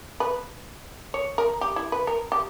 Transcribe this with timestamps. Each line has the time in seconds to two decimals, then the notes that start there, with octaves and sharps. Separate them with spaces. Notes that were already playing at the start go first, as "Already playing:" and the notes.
0.20 B4
1.14 C#5
1.38 A#4
1.61 G4
1.76 E4
1.92 B4
2.07 A#4
2.32 G4